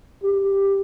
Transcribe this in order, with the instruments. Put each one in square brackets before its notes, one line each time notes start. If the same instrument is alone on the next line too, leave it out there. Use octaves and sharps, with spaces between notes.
[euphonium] G4